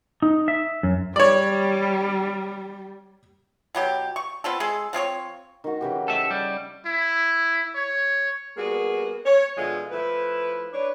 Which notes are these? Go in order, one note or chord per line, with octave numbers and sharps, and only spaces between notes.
D#4
E5
F#2
G3 C#5 D5
B2 F#3 G4
C#6
B3 C4 F4 A4
G#3 G#4 A4
F3 C4 G#4 C#5
D#3 F#4
C#3 E3 G4
A4 D#5 E5
G3
E4
C#5
G3 A#3 B3 F#4 G#4
C#5
B2 D3 F3 G#3 E4 F4
F3 A3 E4 B4
D4 B4 C#5